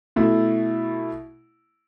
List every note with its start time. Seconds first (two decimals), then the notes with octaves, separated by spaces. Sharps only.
0.16 B2 A3 E4